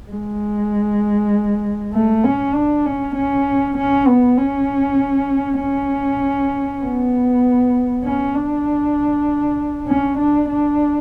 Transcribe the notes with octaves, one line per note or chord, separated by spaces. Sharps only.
G#3
A3
C#4
D4
C#4
C#4
C#4
B3
C#4
C#4
B3
C#4
D4
C#4
D4
D4